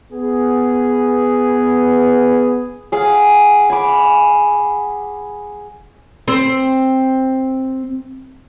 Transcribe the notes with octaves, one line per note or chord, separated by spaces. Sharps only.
B3 G#4
G#4 F5 F#5
G#5 B5 D6
C4 C5